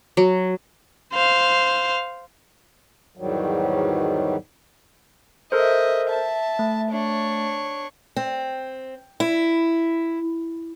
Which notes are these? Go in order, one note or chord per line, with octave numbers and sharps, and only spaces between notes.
F#3
C5 F5
E2 G#2 D#3 F#3 G3
A4 A#4 C5 D#5 E5
E5 A5
A3
D4 C#5
C4
E4